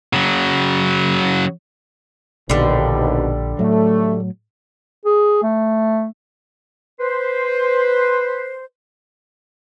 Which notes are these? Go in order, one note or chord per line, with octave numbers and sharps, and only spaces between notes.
C#3 F#3
A#1 D#2 B2 D3 G3
A2 F#3 A3
G#4
A3
B4 C5